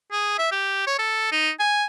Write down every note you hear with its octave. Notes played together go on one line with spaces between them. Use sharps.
G#4
E5
G4
C#5
A4
D#4
G#5